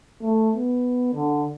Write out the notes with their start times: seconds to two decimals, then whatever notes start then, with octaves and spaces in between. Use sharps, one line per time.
0.22 A3
0.56 B3
1.14 D3